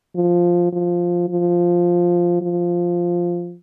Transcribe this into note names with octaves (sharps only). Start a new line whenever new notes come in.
F3
F3
F3
F3